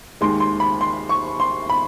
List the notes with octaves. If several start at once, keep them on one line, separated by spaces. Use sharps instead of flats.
D#2 D#3 G#3 C6
C6
B5
C6
C#6
C6
B5